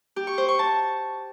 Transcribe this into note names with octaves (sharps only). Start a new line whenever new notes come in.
G4
C#6
C5
C#6
A5